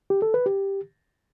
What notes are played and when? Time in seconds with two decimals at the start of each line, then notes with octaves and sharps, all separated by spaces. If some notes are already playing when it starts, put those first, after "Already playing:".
0.10 G4
0.22 A4
0.34 B4
0.46 G4